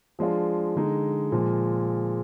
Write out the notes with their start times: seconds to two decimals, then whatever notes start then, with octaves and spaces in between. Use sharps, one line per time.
0.19 F3 G#3 D4 F4
0.76 D3 G#3 D#4
1.32 A#2 F3 G#3